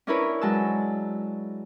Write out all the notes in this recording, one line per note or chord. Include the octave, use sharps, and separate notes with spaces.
C#4 D4 E4 A#4 B4 C#5
F#3 G#3 A5 E6